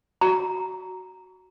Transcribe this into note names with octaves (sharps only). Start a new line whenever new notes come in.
F#4 A#5